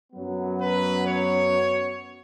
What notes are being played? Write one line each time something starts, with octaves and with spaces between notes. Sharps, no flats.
F#2 F#3 B3
B4
C#5